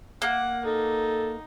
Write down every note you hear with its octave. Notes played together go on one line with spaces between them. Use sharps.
A#3 F#5
D#4 A4